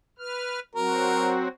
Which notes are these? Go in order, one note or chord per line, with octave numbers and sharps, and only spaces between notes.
B4 F6
F#3 C4 F#4 A#4